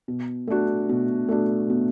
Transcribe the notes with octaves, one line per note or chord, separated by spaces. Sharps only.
B2
A3 D4 F#4
B2
A3 D4 F#4
B2